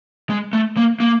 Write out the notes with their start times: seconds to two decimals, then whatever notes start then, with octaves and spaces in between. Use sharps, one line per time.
0.30 G#3
0.53 A3
0.77 A#3
1.00 A#3